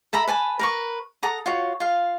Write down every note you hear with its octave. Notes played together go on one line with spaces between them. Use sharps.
A4 E5 A#5 B5
B4 G#5 A5 B5
A#4 B4 C#6
A4 F#5 A#5 D#6
F4 F#4 C#5
F4 F5